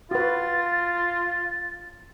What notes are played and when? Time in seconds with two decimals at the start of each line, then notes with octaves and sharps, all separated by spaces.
0.11 F4 F#4 B4 A6